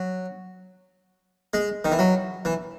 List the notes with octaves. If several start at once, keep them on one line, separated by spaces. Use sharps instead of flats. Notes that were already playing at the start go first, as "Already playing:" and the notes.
Already playing: F#3
G#3
D#3
E3
F#3
E3